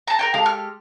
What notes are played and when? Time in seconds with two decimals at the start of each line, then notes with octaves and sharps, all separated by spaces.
0.07 A5 A#5
0.19 A#4 C#5 G5
0.34 G#3 G4 A4 F5
0.46 F6